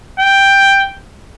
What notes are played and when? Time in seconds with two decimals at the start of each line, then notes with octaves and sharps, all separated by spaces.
0.20 G5